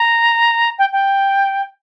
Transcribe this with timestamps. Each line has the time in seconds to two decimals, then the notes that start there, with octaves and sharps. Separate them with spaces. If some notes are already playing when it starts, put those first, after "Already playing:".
Already playing: A#5
0.78 G5
0.92 G5